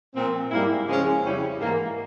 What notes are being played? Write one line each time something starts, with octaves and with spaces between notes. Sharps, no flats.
A#2 F3 C4
G#2 G3 A#3 E4
C#3 F3 G#3 C#4
F2 C#3 G3 C#4 E4
G#2 E3 A#3